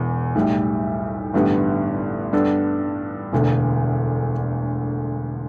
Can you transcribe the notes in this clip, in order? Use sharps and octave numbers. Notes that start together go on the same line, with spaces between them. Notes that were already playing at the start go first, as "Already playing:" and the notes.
Already playing: E1 E2
B1 A2 G3
A1 G2 D3 B3 G4
G2 G3 B3 D4 A4
E1 D2 D3